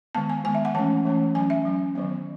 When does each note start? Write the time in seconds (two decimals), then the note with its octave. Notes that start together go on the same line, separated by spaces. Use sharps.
0.15 D#3 G#3 B3 A5
0.30 G#5
0.45 D#3 G#3 B3 G#5
0.55 E5
0.65 F#5
0.75 E3 A3 C#4 A5
1.05 E3 A3 C#4
1.34 F#3 G#5
1.39 C#4
1.50 E5
1.65 F#3 C#4
1.95 D#3 F#3 B3